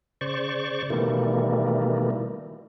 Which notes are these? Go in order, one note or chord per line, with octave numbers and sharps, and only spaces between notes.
C#3 C5 D5 C#6
B2 D#3 E3 G3 A3 A#3